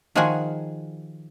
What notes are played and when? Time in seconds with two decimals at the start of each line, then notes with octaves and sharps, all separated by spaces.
0.15 D#3 F3 F#4 G#4 F#5 G#5